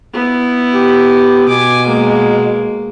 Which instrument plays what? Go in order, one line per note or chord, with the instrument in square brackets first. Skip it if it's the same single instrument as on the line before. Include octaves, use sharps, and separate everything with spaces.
[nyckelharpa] B3 E4
[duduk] G4
[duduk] B2 [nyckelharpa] G#5 D6
[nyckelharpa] G#3 A#3